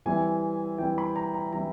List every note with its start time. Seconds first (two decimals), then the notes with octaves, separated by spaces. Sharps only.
0.06 E3 G3 C4 E4 G#5
0.78 E3 G3 C4 E4 G5
0.98 B5
1.16 A#5
1.34 A#5
1.53 E3 G3 C4 E4 A#5